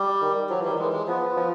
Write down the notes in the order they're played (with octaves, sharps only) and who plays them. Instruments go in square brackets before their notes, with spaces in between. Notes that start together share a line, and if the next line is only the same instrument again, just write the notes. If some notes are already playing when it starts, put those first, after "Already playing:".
Already playing: [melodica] G3
[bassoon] D#3
[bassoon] F3 [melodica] F#3
[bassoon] E3 [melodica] G3
[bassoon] D#3
[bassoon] E3 [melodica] G#3
[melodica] G#3
[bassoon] F3 [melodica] B3
[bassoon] F3